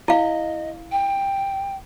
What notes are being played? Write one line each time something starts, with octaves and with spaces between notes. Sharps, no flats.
E4 D#5 F5
G5